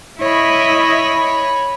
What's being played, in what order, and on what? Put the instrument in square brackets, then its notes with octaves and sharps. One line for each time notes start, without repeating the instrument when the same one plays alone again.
[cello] E4 D#5 [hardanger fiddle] C#5 B5